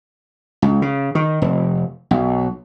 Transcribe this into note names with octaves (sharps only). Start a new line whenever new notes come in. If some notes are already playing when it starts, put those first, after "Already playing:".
C#2
C#3
D#3
F1
B1